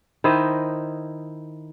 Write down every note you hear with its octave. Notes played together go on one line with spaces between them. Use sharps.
D#3 E4 C5 D#5